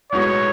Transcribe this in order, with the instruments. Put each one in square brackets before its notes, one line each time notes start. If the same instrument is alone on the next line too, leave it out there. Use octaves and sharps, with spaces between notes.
[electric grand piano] B1 A2 G#3 B3 F#4 [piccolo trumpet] C#5